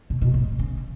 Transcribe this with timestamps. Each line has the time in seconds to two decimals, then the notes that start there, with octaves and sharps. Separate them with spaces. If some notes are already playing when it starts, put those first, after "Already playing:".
0.10 B2
0.21 B2
0.34 A2
0.59 C#3